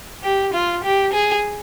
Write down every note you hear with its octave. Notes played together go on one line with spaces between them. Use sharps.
G4
F4
G4
G#4